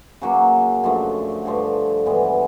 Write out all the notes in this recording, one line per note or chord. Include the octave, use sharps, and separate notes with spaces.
C#3 F#3 A#3
F#2 D3 F3 A3
G2 D3 F3 A3
G2 E3 G#3 B3